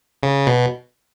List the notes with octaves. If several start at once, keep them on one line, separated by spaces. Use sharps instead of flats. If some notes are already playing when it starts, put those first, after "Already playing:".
C#3
B2